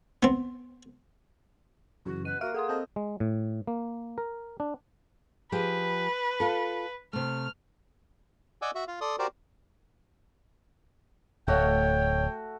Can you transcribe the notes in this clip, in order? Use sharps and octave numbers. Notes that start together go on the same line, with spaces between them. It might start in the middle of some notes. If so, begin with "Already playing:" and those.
B3 C4
F#2 C#3 E3 F#4
B2 B4 D#7
A#3 F#4 E5 F5 F6 F#6
G#4 A4 F#5 C6
C4 A4 D#5 G6
G#3
A2
A#3
A#4
D4
F3 G4 G#4 B4
F4 A4
C3 A3 F6
D5 D#5 F#5 G#5 D6 E6
F#4 E5
F4 F5
A4 D5 C6 D#6
F#4 G4 A#4 C5 D5
D1 A3 F#4 C#5 G5